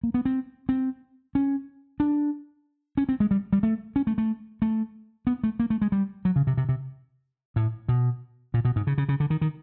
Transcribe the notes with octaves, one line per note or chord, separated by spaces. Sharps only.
A#3
B3
C4
C4
C#4
D4
C#4
C4
G#3
G3
G3
A3
C#4
A3
A3
A3
B3
A3
A#3
A3
G#3
G3
F#3
C#3
C3
C3
C3
A2
B2
A#2
B2
G#2
C#3
C#3
C#3
D3
D#3
D#3